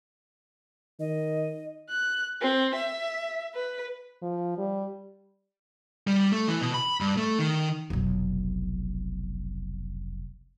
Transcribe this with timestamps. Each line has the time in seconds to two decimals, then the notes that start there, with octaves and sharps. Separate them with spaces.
1.00 D#3 D#5
1.90 F#6
2.42 C4
2.75 E5
3.55 B4
4.22 F3
4.57 G3
6.07 G3
6.32 A3
6.48 E3
6.61 B2
6.74 B5
7.00 G2
7.17 A3
7.39 D#3
7.90 F1 B1